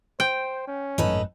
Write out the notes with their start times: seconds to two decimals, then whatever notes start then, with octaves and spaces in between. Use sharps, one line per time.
0.20 C5 G5
0.68 C#4
0.98 G#1 F#2 A2 D#4 A4 B4